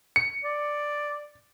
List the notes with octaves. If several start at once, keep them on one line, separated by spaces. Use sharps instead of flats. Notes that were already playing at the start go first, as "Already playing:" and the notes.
C#7
D5